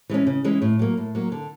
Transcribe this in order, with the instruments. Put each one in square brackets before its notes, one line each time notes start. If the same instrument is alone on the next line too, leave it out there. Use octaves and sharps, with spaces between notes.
[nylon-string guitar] E3 G#3 C#4
C#3
E3 G#3 C#4
A2
F#3 A#3
A2
F#3 A#3
D3